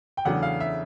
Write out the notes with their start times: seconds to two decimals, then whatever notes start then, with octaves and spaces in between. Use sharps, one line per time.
0.17 G5
0.25 E2 C#3 F#3 A3 D4 F#5
0.43 F5
0.60 E5